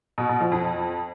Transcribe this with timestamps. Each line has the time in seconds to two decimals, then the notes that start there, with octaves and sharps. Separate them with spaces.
0.18 B2
0.29 B2
0.40 F3
0.52 F2